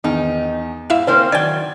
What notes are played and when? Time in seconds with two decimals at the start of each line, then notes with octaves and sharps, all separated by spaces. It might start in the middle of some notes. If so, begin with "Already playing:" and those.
0.04 E2 D#3 D#4
0.90 G#2 E4 E5 F5
1.07 C#3 A#3 C4 C5 G5 C6
1.32 D#3 F#3 D5 G5 G#6 A6